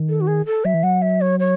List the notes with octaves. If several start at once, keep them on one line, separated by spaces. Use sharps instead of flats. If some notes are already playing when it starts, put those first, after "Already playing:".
Already playing: D#3
A4
F#4
G#4
A4
F#3 E5
E3
F#3 F#5
E5
C#5
C#5